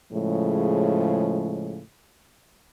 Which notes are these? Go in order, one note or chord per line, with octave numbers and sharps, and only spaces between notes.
A2 C#3 F3 G#3